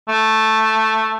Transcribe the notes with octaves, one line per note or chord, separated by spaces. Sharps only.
A3